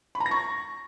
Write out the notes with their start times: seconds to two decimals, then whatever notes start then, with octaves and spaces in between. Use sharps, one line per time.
0.15 B5
0.20 A#5
0.26 A#6
0.31 C#6